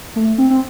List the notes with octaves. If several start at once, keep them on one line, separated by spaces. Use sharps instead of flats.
A3
C4
C4